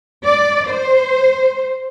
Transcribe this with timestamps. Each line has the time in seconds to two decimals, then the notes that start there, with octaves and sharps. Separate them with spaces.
0.24 D5
0.68 C5